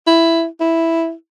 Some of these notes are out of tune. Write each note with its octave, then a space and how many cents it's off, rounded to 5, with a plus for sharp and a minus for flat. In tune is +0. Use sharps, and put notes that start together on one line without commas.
E4 +5
E4 +0